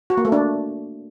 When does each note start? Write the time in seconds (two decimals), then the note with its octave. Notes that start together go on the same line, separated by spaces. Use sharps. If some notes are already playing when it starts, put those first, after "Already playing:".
0.10 F#4
0.17 A#3
0.25 A3
0.32 D4